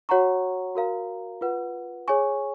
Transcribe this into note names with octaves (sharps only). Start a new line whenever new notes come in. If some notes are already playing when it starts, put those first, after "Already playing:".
F#4 C#5 F#5 A#5 C#6
F#4 A#4 F5 A#5
F4 B4 F#5
G#4 C#5 G#5 C#6